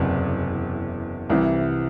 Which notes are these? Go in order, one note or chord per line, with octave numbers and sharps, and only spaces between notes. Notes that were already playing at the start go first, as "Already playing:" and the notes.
Already playing: F#1 E2 C3
C2 C3 E3